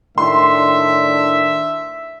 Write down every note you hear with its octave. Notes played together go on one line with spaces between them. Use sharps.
A2 D#3 D4 E5 C6